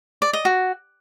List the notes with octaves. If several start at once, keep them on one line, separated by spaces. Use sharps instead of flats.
D5
D#5
F#4